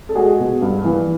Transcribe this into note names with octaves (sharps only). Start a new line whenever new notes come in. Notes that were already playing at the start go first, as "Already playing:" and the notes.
A4
G#3 F#4 G#4
B2
G2
E3